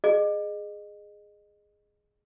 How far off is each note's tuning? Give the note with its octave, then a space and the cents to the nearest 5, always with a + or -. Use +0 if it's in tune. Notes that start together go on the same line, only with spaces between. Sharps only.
G#4 +0 D#5 -25